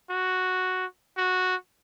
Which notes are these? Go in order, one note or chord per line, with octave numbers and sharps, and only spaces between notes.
F#4
F#4